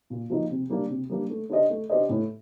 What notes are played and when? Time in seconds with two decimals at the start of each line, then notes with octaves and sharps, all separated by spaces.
0.10 A#2
0.30 F3 A#3 D#4
0.50 C3
0.70 G3 A#3 D4
0.89 C3
1.10 G3 A#3 D4
1.30 A3
1.50 D4 G4 C5 D#5
1.70 A3
1.90 D4 G4 C5 D#5
2.09 A2